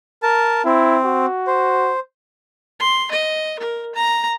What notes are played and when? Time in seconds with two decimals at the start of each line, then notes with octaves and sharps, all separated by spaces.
0.23 A#4 A5
0.65 C4 E4
1.05 F#4
1.47 C5
2.80 C6
3.12 D#5
3.59 A#4
3.95 A#5